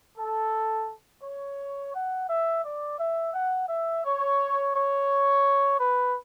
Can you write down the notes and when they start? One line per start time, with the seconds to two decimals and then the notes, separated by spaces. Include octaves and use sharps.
0.18 A4
1.23 C#5
1.93 F#5
2.28 E5
2.64 D5
2.98 E5
3.34 F#5
3.69 E5
4.04 C#5
4.74 C#5
5.79 B4